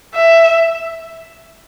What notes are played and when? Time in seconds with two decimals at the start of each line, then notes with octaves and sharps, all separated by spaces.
0.15 E5